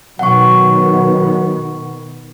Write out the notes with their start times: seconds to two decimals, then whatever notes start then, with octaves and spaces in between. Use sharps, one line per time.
0.19 B2 D#3 F#3 B3 F#5 C#6